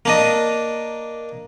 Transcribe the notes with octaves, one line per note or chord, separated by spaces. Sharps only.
A#3 D4 D#5